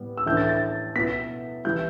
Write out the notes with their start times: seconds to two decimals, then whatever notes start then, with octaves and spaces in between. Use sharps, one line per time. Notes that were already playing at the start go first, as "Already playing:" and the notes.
Already playing: A2 G3 B3
0.17 E6
0.26 A2 E3 A3 D4 G6
0.37 A6
0.49 A6
0.96 B2 B3 E4 B6
1.65 E3 G3 E4 G6